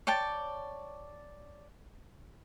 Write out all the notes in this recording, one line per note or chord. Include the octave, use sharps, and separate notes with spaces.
C#5 D5 G5 A5